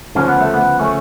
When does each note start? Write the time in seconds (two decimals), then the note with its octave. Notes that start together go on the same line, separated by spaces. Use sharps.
0.15 D2 C#3 F3 C#4
0.28 B3
0.41 A3
0.54 B3
0.80 A3 C#4